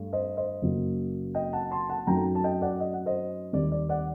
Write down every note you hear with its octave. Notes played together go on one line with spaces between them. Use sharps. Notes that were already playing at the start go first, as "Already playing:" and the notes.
Already playing: G2 A3
C5 D#5
C5 D#5
F#1 F#2 F#3 A#3
D#5 G5
F#5 A5
A5 C6
F#5 A5
F#2 F#3 A3 D#4 G5 A#5
A5
D#5 G5
D5 F#5
D#5
F#5
C5 D#5
D#2 D#3 G3 D5
D5
D5 F#5